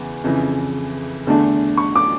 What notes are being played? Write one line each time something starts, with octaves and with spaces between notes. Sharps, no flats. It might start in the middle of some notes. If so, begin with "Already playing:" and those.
Already playing: E2 C#3 E3
F2 C#3 E3
E2 D3 A3 D4
C#6
D6